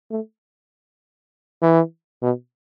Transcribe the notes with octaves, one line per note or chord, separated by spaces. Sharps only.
A3
E3
B2